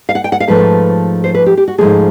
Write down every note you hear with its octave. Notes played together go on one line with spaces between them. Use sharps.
F5
F#5
G5
F#5
F5
G#2 F3 A3 B4
C5
B4
G4
G4
F#4
G#2 F3 A3 G#4